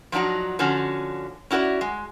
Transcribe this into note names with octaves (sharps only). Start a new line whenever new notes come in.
F3 F#3 D4 D#4 F#4
D3 F3 C#4 F#4
C#4 E4 F#4 B4 D5
G#3